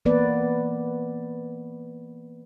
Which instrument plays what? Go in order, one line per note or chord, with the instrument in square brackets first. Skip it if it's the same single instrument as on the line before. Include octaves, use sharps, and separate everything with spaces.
[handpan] E3 A#3 B3 B4 D5